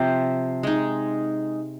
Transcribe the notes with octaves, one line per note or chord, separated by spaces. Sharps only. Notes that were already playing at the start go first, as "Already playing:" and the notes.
Already playing: C3 F3 C4 C5
G#3 D#4